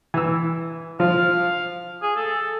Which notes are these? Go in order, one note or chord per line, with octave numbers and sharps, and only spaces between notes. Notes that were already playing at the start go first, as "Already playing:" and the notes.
E3 E6
F3 F4 F5
G#4
A4